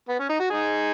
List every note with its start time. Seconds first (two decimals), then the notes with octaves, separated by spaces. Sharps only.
0.08 B3
0.19 C#4
0.29 D#4
0.39 F#4
0.50 D#4 G#4